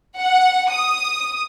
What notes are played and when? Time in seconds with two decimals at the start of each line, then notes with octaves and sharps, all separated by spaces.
0.20 F#5
0.72 D#6